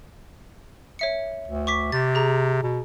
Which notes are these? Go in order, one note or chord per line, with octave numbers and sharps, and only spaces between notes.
C#5 E5 C#7
D2
C#6 D6 B6
C3 A6
G#4 A#5
B2